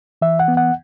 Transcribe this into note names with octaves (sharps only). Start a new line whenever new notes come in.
E3 E5
F#5
B3
F#5